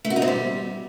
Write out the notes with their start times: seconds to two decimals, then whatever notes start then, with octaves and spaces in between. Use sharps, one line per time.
0.05 A3
0.10 F#4
0.16 D#4
0.22 C4
0.28 G3